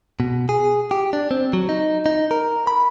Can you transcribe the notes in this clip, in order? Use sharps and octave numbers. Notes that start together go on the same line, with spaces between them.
B2
G#4
G4
D4
C4
F#3
D#4
D#4
A#4
B5